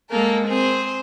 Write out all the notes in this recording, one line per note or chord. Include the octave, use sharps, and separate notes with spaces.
G#3 A#3 A4 A#4
C4 G#4 C5